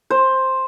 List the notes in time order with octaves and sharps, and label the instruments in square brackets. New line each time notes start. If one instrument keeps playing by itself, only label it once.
[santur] C5